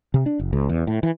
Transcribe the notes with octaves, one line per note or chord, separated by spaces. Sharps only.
C3
D4
F#1
C#2
E2
A2
E3